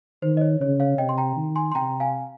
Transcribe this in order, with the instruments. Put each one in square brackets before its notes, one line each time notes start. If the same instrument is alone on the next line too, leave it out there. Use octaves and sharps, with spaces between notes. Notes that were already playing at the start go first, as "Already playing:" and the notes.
[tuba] D#3 [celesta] C5
[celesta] D#5
C#5
[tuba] C#3 [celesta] C#5
[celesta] C#5 F5
[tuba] C3 [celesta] D#5 G5
[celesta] C6
G5 A#5
[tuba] D#3
[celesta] G#5 C6
C6
[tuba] C3 [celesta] G5 A#5
[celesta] F5 G#5